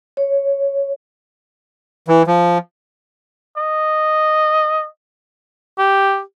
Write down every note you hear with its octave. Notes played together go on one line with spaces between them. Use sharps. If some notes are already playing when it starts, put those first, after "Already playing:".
C#5
E3
F3
D#5
G4